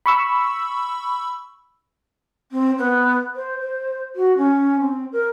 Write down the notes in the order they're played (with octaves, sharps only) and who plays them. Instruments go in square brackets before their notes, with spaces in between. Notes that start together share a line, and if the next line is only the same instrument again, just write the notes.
[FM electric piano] B5 C#6 E6
[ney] C4
B3
C5
C5
F#4
C#4
C4
A#4